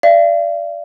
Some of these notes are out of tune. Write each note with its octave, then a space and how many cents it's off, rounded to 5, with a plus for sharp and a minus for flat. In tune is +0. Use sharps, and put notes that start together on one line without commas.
D5 -5 F5 -45